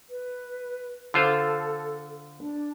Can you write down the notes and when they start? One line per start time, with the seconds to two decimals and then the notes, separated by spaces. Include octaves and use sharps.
0.10 B4
1.14 D3 F4 A4 C5
2.39 D4